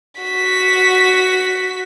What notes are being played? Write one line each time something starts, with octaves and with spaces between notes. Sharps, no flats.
F#4 B6